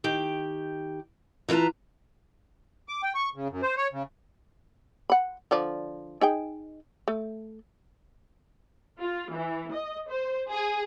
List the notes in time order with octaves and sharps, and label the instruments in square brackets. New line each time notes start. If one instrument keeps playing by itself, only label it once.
[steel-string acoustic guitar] D#3 G4 G5
E3 F4 B4 A5 A#5
[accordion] D6
G5
C#6
C#3
F#2
C5
C#5
C#3
[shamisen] F#5 B5
D3 F3 D5
D#4 G#4 G5
A3
[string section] F4
E3
D#5
C5
G#4